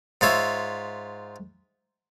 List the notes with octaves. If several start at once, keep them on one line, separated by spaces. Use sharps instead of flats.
G#2 F4 C#5 E5